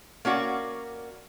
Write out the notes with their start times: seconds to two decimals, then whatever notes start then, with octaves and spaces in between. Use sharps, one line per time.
0.25 A#3 C#4 F#4 D5